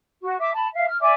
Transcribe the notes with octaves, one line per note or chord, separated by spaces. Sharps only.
F#4
E5 D6
A5 B5
E5 F5
F6
D5 E5 G#5 D6